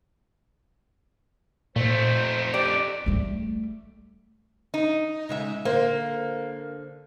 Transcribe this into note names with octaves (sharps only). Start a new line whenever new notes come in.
F2 A#2 A3 C5
G4 D5
G3 A3
D#4
C#3 G#3 E5
D3 A#3 C5